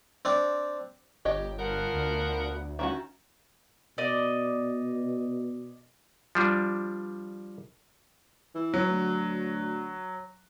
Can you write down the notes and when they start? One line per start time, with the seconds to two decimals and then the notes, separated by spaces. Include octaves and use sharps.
0.25 C4 D4
1.25 G1 G4 C#5 D#5
1.59 F3 B3 A#4 F#5
1.93 D2
2.79 D#3 C#4 F#4 E5
3.98 B2 D5 D#5
6.35 F3 G3 D4
8.55 E3
8.74 F#3
8.89 D2